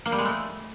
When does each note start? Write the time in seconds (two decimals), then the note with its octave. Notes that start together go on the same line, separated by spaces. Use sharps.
0.06 A#3
0.12 G3
0.18 G#3
0.25 A3